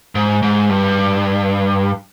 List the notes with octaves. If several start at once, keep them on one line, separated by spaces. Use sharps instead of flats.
G#2
G#2
G2